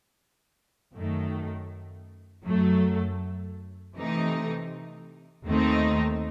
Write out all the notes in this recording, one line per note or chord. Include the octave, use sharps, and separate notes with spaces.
F#2 D#3 A3
F#2 F#3 A3
C3 E3 A3 D#4
D#2 D#3 A3 C4 D#4